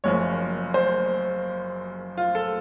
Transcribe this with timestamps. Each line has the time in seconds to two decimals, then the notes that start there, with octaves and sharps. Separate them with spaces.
0.04 F#1 F#2 F3 C#5
0.74 C5
2.18 F4
2.35 A4